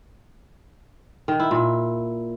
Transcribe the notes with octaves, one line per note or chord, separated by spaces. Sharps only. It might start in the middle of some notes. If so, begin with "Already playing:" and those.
D#3
E4
A#2